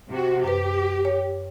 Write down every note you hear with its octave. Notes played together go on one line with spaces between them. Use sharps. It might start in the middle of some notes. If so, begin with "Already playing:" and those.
C3 F#4
F#2 G4 B4
C#5